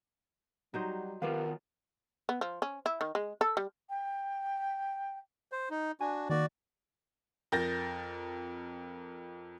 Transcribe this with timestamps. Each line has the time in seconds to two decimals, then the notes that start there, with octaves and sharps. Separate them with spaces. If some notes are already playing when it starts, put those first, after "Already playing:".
0.74 F#3 G3 D#4 F#4 C5
1.22 D#3 B3 F4 G4 A#4 B4 F5
2.29 B3
2.41 F3
2.62 C#4
2.86 E4
3.01 D#3
3.15 G#3
3.41 A4
3.57 G3
3.89 G5
5.52 C5
5.71 D#4
6.01 D4 F#4 G#5
6.29 D#3 A#3 F#4 D5
7.52 F2 A#4 G6 A6 A#6